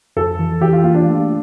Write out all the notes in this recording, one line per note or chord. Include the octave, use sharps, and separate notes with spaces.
F2 A4
E3
E3 G4
F4
A#3 F4
D4
A3